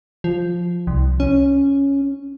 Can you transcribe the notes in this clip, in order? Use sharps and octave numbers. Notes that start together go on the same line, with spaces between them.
F3
C2
C#4